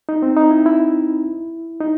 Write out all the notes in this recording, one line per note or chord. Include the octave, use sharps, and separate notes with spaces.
D#4
C4
D#4
E4
E4
D#4